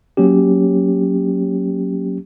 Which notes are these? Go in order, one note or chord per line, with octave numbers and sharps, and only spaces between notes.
F#3 A#3 C#4 G4